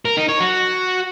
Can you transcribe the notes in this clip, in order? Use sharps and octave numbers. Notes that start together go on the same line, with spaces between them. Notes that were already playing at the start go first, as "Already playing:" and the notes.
A#4
D#4
C#5
F#4